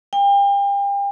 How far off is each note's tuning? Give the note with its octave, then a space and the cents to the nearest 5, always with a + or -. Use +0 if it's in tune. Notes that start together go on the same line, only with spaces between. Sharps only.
G5 +35